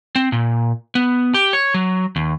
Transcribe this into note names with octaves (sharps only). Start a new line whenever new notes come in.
C4
A#2
B3
G4
C#5
F#3
D#2